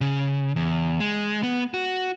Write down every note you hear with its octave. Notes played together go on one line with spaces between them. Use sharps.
C#3
E2
G#3
B3
F#4